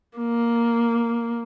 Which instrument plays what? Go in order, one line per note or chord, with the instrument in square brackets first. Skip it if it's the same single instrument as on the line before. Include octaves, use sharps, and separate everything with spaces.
[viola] A#3